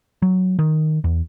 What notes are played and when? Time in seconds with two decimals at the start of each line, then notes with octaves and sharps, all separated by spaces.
0.22 F#3
0.59 D#3
1.04 E2